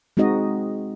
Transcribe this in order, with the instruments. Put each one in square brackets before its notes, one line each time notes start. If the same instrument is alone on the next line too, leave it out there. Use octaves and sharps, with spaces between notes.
[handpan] G#3 C4 D#4 F#4 D#5